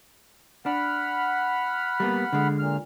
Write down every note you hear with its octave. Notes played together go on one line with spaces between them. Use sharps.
D4 F#5 B5 F6
G3 A#3 B3
D3 G#3
A#2 F6